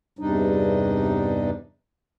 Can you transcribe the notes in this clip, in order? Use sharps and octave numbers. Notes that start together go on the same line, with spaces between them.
E2 G2 C3 G3 D4 D#4